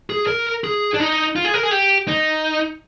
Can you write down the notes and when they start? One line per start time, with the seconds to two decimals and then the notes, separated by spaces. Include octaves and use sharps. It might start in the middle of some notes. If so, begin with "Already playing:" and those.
0.10 G#4
0.27 A#4
0.64 G#4
0.94 D4
1.00 D#4
1.36 F4
1.45 G#4
1.54 A#4
1.63 G#4
1.71 G4
2.08 D#4